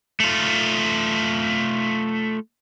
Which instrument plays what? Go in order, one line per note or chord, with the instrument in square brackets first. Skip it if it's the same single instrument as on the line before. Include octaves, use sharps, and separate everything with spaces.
[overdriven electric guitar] A3 F4